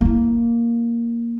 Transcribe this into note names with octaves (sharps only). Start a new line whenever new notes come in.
A#3 E4